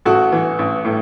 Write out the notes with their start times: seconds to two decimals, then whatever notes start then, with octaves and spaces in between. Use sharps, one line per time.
0.05 A1 F#4 A4
0.32 E3
0.59 A1
0.85 A2